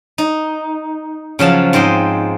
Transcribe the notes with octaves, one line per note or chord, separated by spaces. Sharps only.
D#4
C#3 F3 F#3 A5
G#2 C4 D#5 G5 C6